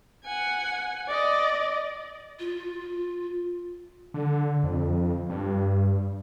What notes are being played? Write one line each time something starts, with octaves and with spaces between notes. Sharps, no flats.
F#5 G#5
D5 D#5
F4
D3
F2
G2